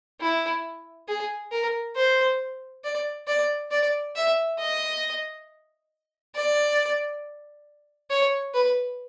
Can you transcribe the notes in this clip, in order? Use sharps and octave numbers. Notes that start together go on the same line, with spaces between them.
E4
G#4
A#4
C5
D5
D5
D5
E5
D#5
D5
C#5
B4